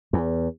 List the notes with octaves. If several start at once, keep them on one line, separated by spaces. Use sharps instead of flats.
E2